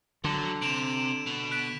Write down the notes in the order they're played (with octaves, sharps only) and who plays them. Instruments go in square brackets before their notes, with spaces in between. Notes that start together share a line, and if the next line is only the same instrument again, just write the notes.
[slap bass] D3 [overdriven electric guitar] F#3
[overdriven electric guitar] C3 [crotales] D7 E7 F7
[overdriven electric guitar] B2
[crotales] F#6 B6 D7